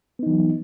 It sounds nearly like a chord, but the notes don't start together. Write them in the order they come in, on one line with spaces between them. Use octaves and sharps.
B3 D#4 E3 F#3